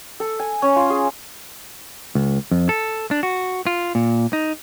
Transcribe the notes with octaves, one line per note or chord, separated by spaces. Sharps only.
A4
G#5
C#4
F4
G#4
C#2
F2
A4
D4
F#4
F4
A#2
D#4